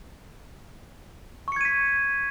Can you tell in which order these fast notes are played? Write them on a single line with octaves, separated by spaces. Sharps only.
C#6 C#7 G#6 D#7 B6